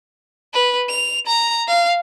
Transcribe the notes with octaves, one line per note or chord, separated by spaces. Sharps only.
B4
F7
A#5
F5